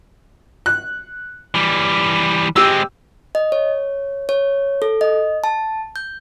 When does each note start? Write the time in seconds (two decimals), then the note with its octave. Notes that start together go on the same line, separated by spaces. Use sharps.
0.66 F#6
1.54 E3 G3
2.56 G#3 C4 G4 E6
3.35 D#5
3.52 C#5
4.29 C#5
4.82 A4
5.01 D#5
5.44 A5
5.96 G6